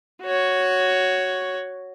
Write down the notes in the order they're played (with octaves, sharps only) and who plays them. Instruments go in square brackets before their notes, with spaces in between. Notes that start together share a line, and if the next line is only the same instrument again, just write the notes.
[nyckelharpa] F#4 C#5